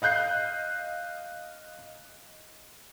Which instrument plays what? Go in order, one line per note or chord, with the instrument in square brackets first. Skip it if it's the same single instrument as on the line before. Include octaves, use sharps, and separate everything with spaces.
[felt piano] D#5 F5 F#6 G6 C7